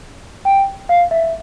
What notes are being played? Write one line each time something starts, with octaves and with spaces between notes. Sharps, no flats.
G5
F5
E5